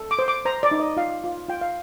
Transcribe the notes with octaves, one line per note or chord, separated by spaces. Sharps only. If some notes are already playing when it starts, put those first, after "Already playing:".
Already playing: A4
D6
C5
D6
C5 A#5
D5
D#4
D#5
F4 F5
F4
F4 G5
F5